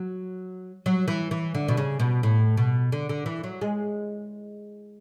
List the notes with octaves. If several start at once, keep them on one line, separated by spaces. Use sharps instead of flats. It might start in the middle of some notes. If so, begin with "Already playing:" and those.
Already playing: F#3
F#3
E3
E3
D3
B2
C#3
B2
A2
B2
D3
D3
E3
F#3
G#3